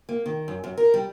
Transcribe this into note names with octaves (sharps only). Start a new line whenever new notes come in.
A#3
D#3
F#2
F#2
A#4
G3